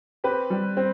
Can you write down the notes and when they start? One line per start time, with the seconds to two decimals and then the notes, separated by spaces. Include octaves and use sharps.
0.24 C4 G4 B4
0.50 G3
0.77 C4